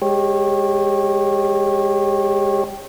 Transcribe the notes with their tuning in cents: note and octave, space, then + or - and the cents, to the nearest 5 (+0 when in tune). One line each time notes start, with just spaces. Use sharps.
G#3 -25 G4 +0 C#5 -30